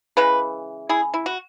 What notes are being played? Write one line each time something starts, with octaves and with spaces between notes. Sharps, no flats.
C#3 E3 G#3 B4
E4 G#4
E4
F#4